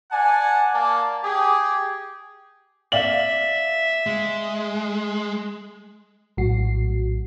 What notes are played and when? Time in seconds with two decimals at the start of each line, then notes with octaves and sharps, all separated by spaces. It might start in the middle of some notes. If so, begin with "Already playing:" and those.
0.12 D5 F#5 G#5 A5
0.74 A#3 D5 A5
1.24 G4 G#4
2.92 D5 E5 F5 F#7
4.06 G#3
6.37 A#1 A2 F#3 F#4 C7